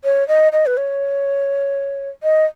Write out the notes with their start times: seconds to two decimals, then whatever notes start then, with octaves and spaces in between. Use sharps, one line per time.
0.04 C#5
0.28 D#5
0.52 D#5
0.66 B4
0.77 C#5
2.23 D#5